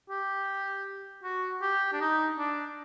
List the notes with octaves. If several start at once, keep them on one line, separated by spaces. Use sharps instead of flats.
G4
F#4
G4
D4
D#4
D4